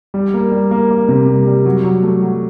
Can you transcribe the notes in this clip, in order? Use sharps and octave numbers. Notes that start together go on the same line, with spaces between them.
G3
A#3
G3
A#3
A#3
C3
G3
G3
F#3
F#3
A3
F#3